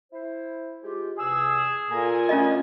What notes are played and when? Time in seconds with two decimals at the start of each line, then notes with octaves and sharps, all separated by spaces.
0.12 E4 C5
0.83 G#3 F4 G4
1.19 E2 C3 G#4 E6
1.90 A#2 A4 G#5 A#5
2.29 B1 A3 C#4 F4 D#5